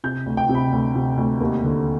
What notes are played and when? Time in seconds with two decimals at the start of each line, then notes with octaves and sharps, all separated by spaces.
0.04 C3 G6
0.26 D2
0.37 G5
0.49 C3
0.55 B5
0.72 D2
0.95 C3
1.17 D2
1.41 D#2
1.64 D3